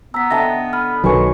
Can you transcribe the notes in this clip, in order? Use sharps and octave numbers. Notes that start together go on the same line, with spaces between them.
B3 A#5 E6 B6
D3 D#5 E5 G5 A5 A#6
B5 F6
B1 D#3 F#3 G#3 A4 B4 G#5 C#6